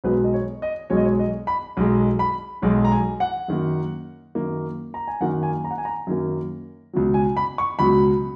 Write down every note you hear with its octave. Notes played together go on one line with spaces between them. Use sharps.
B1 B2 G#3 B4
D#5
C#5
D#5
B1 B2 G#3 C#5
D#5
C#5
D#5
B5
B1 B2 G#3
B5
B1 B2 G#3
A#5
G#5
F#5
F#2 D#3 A#3
F#2 D#3 A#3
A#5
G#5
F#2 D#3 A#3 F#5
G#5
A#5
F#5
G#5
A#5
F#2 D#3 A#3
C#2 B2 F#3
G#5
B5
C#6
C#2 B2 F#3 B5